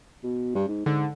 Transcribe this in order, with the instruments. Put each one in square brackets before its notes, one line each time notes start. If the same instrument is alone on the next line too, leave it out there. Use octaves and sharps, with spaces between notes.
[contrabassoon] B2
G2
G#2
[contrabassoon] G#2 [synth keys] D3